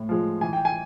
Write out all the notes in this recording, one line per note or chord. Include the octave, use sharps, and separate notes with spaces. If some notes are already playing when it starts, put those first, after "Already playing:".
Already playing: A2
F3 G#3
E3 G#5
G5
G#5